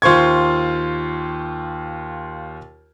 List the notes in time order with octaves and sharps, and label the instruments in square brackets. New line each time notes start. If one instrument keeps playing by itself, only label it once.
[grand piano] D#2 F4 C5 C#6 G#6